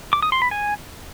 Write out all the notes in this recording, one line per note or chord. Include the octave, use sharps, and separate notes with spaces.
D6
D#6
C6
B5
G#5